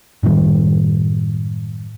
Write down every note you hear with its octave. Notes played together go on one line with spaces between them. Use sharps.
F#2 A2 D#3 G3